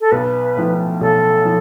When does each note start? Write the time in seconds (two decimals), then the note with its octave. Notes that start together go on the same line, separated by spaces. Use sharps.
0.01 A4
0.11 B1 B4
0.56 A2 F3
1.01 B1 A4
1.45 F3